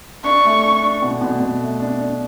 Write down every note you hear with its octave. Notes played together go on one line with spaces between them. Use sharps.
D4 C#6
A3
D4
D4
B2
B2
B2
A3
D4
D4